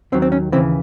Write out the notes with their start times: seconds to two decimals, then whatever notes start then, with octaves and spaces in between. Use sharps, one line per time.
0.12 D#2 D#3 F#3 C4
0.22 C4
0.32 C#4
0.52 D#2 C#3 E3 C4